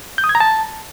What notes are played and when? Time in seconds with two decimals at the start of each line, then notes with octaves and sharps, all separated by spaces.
0.18 G6
0.24 D#6
0.29 G#6
0.35 A#5
0.40 A5